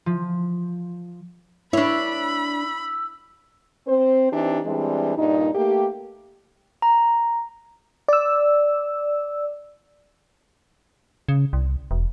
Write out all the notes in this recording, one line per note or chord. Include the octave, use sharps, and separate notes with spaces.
F3
D4 E4 C#5 B5 E6
C4 C5
E3 C4 D4 D#4 G4
E3 G3 G#3 C4 D4
G2 A#2 D#4
A3 A#3 G4
A#5
D5 E6
C#3
C2
E1